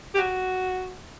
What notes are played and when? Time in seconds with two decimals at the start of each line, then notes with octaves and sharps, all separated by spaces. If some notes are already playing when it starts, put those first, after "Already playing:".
0.15 G4
0.18 F#4